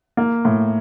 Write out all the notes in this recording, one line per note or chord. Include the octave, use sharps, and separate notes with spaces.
A#3
A2